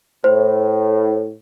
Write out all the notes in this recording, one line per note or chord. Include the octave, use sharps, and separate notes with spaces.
A2 C5